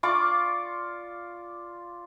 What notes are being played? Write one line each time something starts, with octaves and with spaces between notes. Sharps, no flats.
F4 D5 C#6 D6